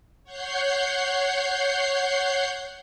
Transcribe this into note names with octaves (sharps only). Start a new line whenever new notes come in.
C#5 F#5 G6 C7